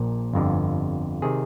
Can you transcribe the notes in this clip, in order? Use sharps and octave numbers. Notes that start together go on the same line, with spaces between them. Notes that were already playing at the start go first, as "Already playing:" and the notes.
Already playing: A#1 A#2
G1 F2 D3
C3 D#3 G#4